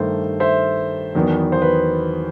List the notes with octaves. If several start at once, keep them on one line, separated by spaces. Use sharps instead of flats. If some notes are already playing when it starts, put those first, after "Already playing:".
Already playing: G2 D#3 A3 C5
C5 E5
E2 D#3 F#3 B3
C5
B4